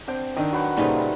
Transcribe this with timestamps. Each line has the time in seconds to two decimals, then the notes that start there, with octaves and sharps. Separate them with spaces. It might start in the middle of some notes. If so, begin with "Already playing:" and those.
0.08 C4 D4 G5
0.36 D#3 D4 D#5 E6
0.52 F#3 B4 F#5
0.77 A#2 C#3 G3 A3 D#4 B4 C5